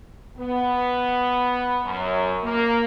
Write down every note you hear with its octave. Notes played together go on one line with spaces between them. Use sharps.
B3
F#2
A#3